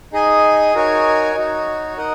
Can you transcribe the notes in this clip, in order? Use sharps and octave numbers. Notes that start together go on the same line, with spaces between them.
D#4 G#4 D#5 G#5
D#4 F#4 A#4 C#5 G#5
D#4 F#4 C#5
D#4 A#4 D#5 F#5